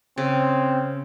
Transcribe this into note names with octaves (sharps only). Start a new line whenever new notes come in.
C#3 C4